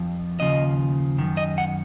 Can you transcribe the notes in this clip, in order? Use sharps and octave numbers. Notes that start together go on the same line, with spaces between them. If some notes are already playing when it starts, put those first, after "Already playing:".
Already playing: F2 F3
D#2 C#3 F3 D#5
F#2 D#3
D#5
F#5